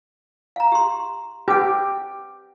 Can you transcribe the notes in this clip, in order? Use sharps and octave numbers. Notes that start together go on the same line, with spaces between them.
F5 A#5
G4 C6
G4 B4 F#5